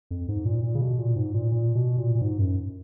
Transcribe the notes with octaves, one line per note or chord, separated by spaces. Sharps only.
F2
G#2
A#2
A#2
C#3
B2
A#2
G#2
A#2
A#2
B2
A#2
A#2
G#2
F#2